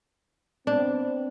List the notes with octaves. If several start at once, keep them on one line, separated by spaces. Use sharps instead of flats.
B3 C4 D4